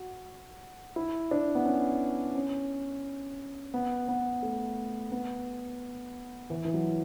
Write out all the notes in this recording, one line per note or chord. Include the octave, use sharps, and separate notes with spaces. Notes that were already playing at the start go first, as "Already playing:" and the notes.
Already playing: F#4
E4
D4
B3
C#4
C#4
B3
B3
A3
B3
E3
E3
F#3